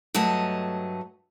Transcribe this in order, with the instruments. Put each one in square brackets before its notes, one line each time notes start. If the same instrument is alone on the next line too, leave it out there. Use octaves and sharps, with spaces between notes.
[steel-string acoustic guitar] G2 F#3 A3 D#5 A5